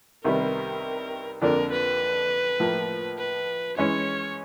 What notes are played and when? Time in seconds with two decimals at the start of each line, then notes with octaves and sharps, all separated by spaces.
0.24 C2 C3 D#3 G3 B3 A#4
1.42 F2 D3 F3 A#3 D4 A#4
1.72 B4
2.60 A2 F3 A#3
3.18 B4
3.77 E3 G#3 C#4 C#5